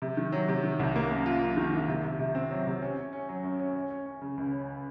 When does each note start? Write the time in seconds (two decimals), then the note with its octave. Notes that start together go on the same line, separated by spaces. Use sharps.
0.02 C3
0.17 D#3
0.32 F#3
0.49 C3
0.64 D#3
0.80 C2
0.96 A#3
1.11 F#2
1.26 F4
1.41 F#2
1.57 D#3
1.73 D#3
1.88 C3
2.04 C3
2.19 C3
2.35 C4
2.51 F#3
2.67 C3
2.82 C#4
2.97 C#4
3.13 C#4
3.28 F#3
3.43 F#2
3.60 C#4
3.75 C#4
3.90 C#4
4.06 C#4
4.21 C#3
4.37 C#2
4.52 C#4